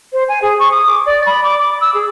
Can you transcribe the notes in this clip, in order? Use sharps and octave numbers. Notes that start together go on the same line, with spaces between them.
C5
G#5
G#4
C#6
D#6
D6
D5
B5
D6
D6
E6
G#4